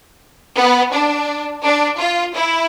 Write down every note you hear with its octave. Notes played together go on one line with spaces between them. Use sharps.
B3
D4
D4
F4
E4